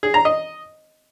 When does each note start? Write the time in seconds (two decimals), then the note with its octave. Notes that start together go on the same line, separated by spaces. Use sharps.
0.03 G#4
0.14 A#5
0.25 D#5